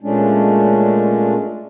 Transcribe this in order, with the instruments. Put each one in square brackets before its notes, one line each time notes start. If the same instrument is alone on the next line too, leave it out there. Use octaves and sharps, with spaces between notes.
[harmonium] A#2 G#3 A3 C#4 D4